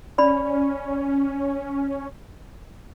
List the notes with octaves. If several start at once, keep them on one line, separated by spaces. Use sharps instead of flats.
C#4 D5 B5